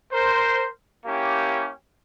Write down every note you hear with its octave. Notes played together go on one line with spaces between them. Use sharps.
A#4 C5
A#3 C#4 E4 G4